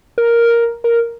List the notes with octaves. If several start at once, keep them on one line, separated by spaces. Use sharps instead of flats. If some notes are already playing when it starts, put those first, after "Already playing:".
A#4
A#4